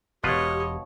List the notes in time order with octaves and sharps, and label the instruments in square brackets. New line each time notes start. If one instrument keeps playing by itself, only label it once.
[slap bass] E1 E2 [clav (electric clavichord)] B2 F4 B4 [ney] G4 [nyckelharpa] C#5 D#5